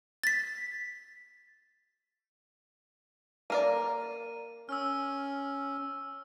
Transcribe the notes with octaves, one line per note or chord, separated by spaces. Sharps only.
A6 B6
A#3 A#4 D5 D#7
C#4 E6 F6